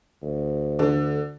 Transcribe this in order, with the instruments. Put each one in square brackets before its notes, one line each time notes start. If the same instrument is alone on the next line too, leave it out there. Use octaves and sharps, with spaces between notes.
[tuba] D2
[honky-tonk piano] D3